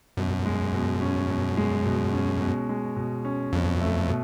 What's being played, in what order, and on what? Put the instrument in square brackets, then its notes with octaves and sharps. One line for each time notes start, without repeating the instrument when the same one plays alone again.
[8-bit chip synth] F#2 [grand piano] B2
[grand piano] G#3
B2
C#4
B2
G#3
B2
C#4
B2
G#3
B2
C#4
[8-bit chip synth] F2 [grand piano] B2
[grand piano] A3
B2